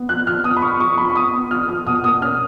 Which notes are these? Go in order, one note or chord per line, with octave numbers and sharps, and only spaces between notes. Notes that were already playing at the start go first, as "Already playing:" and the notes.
Already playing: B3
F3 F#6
F3 F6
B3 D#6
B5
B3 C#6
F3 C#6
F3 B5
C#6
B3 D#6
B3
F3 F6
F3 D#6
B2 D#6
A#3 D#6
C#4 F6